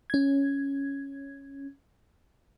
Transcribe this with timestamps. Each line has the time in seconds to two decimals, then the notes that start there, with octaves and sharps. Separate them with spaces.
0.10 C#4 G#6